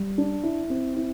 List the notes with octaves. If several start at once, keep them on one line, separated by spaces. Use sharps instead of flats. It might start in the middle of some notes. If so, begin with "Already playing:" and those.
Already playing: G3
D4
E4
C4
E4